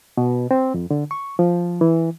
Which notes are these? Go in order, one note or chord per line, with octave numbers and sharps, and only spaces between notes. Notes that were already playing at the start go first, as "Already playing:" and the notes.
B2
C4
F2
D3
C#6
F3
E3